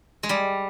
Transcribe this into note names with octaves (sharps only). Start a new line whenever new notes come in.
G#3
G3